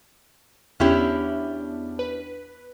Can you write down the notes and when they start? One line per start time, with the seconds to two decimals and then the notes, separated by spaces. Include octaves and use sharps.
0.80 E2 B3 C#4 D4 E4 G4
1.99 B4